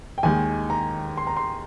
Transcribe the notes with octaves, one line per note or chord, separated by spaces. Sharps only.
G5
D#2 D#3 G#3 G#5
A#5
C6
A#5
C6